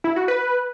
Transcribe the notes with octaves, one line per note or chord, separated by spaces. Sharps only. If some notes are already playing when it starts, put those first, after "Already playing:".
E4
F#4
B4